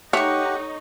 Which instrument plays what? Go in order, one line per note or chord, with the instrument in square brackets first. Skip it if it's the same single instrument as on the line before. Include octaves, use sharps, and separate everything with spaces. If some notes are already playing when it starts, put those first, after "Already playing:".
[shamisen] A3 [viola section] D#4 [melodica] G4 F#5 [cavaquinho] C#5 C#6